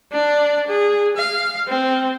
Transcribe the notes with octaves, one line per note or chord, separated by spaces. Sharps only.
D4 D5
G#4
F5
C4